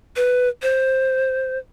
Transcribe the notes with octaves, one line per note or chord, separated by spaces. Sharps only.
B4
C5